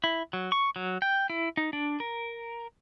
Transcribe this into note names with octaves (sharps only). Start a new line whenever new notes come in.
E4
F#3
C#6
F#3
G5
E4
D#4
D4
A#4